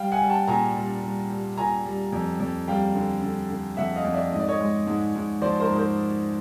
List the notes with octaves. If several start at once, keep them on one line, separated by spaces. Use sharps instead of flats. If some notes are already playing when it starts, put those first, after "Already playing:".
Already playing: G3 F5 G5
F#5 G#5
G3
G5 A5
A#2 G#5 A#5
G3
G3
G3
A#2 G#5 A#5
G3
F2
F2
G3 F5 G5
D3
D3
D3
F2 E5 F#5
D#5 F5
F2
D5 E5
G#2 D#5
D5
C#5 D#5
G#3
G#2
G#2
F3 C5 D5
A#4 C5
G#2
A#4 C5